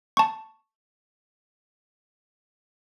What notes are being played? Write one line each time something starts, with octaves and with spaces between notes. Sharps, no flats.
A5 C#6